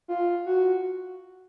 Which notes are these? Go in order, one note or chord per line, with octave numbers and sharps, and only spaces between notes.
F4
F#4